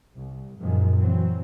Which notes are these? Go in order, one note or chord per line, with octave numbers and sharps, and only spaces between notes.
C2
F#2 A#2 D#3 F3 G#3
E3 F#3 C4